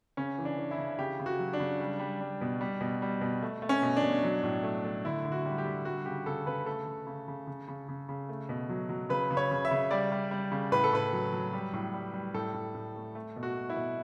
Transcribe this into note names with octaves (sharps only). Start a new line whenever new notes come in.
C#3 C#4
E3
D4
E3
E4
C#3
C#3 G4
C#3
F#4
F#3
D4
C#3
G3
G3
G3
B2
G3
B2
G3
B2
A3
A3
C#4
B2
D4
B2
F#3
A2
A3
A3
D3 E4
D3
F#4
G3
G4
D3
G3 F#4
C#3 G4
C#3 A4
C#3 B4
A3 A4
C#3
C#3
C#3
C#3
C#3
C#3
C#3
A3
B2
F#3
F#3
C#3 B4
C#3
C#5
C#3
E5
C#3
G3 D5
G3
G3
C#3
A2 B4
A4
A2 B4
F#3
F#3
G3
A2
G3
G3
A2 A4
A2
A2
A3
A3
B2
F#4
A3
E4
B2